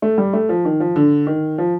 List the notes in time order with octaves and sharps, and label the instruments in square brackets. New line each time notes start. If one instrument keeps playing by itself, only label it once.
[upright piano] A3
G3
A3
F3
D#3
F3
D3
D#3
F3